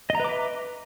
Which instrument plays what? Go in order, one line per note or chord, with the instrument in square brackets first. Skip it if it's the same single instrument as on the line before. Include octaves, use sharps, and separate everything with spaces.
[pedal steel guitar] D#5
A#5
B4
D6
E5